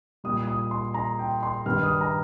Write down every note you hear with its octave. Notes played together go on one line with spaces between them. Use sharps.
A#2 G3 D#6
D#6
C6
A#5
G5
C6
G2 D#3 G3 F6
D#6
A#5